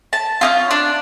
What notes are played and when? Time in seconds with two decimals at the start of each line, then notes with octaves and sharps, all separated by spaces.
0.13 A5
0.41 C#4 D#4 F4
0.71 D4